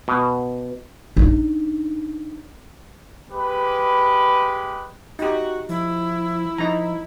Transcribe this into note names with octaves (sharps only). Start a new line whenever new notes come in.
B2
D4 D#4
G#3 G4 B4
D#4 F#4 G4
F3 E4
F3 D#4 A#5